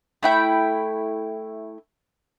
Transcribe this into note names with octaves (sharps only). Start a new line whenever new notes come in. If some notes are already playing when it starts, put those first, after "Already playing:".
A3 E4 G5